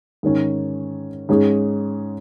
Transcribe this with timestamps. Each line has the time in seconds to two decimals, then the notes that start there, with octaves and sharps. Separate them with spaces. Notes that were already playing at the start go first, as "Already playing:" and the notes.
0.23 G#2 D#3 C#4
1.29 G#2 G#3 C#4 G#4